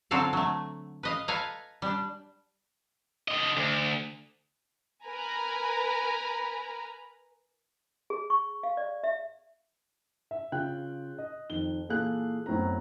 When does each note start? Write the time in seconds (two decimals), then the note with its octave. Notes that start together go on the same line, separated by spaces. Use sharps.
0.11 D3 F#3 C4 F4 A4 F5
0.33 F#3 A3
1.03 B4 D#5 F5
1.28 A4 B4 F5 G#5 A#5
1.82 G3 D4
3.28 D3 D#5
3.57 D2
5.04 A#4 B4 G#5 A#5 B5
8.10 G#4
8.30 C#6
8.63 F5
8.77 D5
9.04 E5
10.31 E5
10.52 C#3 F4 G5 F#6
11.18 D#5
11.50 F2 D#3 G7
11.89 A#2 E3 G#4 A4 F5 F#6
12.46 F#2 A2 B3 C4 A#5